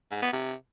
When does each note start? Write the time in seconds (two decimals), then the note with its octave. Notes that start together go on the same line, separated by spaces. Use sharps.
0.11 G#2
0.22 B3
0.33 C3